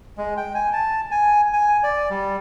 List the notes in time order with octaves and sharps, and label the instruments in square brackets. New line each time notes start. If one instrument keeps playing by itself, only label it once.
[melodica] G#3
G5
G#5
A5
G#5
G#5
D5
G3